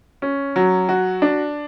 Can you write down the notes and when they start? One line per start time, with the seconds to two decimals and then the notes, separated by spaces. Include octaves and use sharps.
0.22 C#4
0.56 F#3
0.89 F#4
1.22 D4